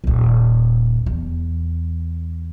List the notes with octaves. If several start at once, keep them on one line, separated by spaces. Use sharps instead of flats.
D#1 G#1
E2